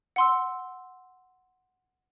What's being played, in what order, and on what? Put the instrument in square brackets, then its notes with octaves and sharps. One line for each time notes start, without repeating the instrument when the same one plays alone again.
[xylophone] F#5 C6 E6